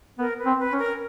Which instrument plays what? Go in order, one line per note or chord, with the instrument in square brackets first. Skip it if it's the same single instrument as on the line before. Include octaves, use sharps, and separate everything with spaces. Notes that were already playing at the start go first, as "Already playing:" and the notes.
[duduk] B3 [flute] A#4
[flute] B4
[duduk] C4
[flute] B4
[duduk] C#4
[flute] A#4